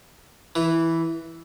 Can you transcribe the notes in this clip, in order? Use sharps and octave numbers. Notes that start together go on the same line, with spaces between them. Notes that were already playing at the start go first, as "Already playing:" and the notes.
E3